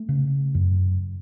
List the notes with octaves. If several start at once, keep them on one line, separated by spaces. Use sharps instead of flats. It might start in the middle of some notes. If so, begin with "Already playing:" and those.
Already playing: A3
C#3
F#2